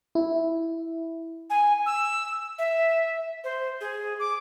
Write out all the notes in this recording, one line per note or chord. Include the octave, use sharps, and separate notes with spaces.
E4
G#5
E6
E5
C5
G#4
D6